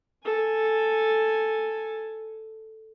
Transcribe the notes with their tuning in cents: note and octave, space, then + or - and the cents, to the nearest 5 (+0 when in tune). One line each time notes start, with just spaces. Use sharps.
A4 +0 G#5 +0